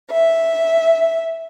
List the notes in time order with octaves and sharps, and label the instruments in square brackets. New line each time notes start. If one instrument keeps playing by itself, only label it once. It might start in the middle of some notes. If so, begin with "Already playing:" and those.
[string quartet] E5